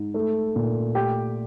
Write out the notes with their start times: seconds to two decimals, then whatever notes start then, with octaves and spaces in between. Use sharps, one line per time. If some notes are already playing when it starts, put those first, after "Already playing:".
Already playing: G#2
0.14 A3
0.56 A#2
0.95 A3 G4 G5